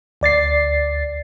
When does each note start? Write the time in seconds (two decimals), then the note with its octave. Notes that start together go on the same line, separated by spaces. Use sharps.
0.21 D2 D5 A6 C7